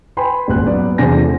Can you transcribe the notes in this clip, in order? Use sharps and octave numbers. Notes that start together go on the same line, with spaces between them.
B4 G5 G#5 B5 C6
D#1 G#1 F#6
F#3 B3 D5
E2 C3 D4 C5 G#5 A#6
F3 A3